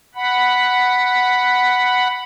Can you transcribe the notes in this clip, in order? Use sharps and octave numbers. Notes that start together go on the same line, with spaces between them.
F#5 B5